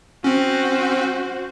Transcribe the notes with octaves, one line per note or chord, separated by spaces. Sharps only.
C4 C#4 F#4 C5